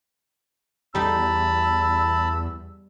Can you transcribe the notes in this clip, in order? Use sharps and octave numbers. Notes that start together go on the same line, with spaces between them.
E2 G3 D#4 A5 B5 E6